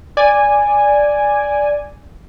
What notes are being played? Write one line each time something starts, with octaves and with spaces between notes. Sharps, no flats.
D5 G#5